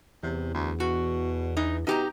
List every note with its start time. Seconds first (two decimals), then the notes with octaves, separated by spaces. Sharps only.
0.23 E2 C3
0.54 D2
0.80 B2 F#4
1.57 E3 D#4
1.87 B2 D#4 G4 A#5